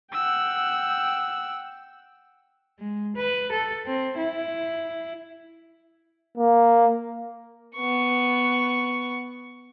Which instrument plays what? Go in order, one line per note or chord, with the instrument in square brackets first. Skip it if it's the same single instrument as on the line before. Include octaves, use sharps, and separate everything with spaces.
[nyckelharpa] F#5 G5 [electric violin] E6
[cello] G#3
B4
A4
C4
E4
[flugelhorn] A#3
[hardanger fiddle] B3 C#6